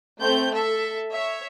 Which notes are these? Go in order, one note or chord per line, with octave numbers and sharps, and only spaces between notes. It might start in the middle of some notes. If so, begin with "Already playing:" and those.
A3 C4 G6
A4 E5
C#5 E5